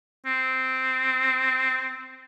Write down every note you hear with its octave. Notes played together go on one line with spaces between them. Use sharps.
C4